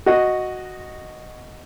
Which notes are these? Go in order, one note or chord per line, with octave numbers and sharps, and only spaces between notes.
F#4 D#5